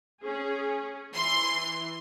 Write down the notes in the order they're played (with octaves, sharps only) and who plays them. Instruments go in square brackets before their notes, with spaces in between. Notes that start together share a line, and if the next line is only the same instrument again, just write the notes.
[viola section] C#4 G#4
[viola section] E3 [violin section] C6